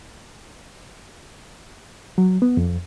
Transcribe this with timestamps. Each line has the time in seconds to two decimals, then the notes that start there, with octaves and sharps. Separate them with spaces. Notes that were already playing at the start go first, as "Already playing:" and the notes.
2.18 F#3
2.42 B3
2.57 F2